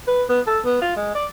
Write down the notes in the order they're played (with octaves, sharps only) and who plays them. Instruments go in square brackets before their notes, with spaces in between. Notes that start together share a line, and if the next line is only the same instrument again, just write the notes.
[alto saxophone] B4
B3
A4
B3
F4
G#3
D5